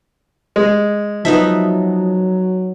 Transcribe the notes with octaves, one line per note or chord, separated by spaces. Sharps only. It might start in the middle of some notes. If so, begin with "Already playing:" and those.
G#3
F3 F#3 B3 D#4 E5 A5